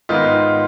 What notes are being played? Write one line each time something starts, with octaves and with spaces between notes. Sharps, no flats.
G#2 D#3 G#3 B3 D#4 F4